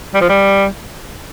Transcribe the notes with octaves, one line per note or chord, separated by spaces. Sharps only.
G3
F3
G3